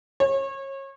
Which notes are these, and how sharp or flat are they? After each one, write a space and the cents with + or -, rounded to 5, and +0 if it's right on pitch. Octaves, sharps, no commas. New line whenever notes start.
C#5 -30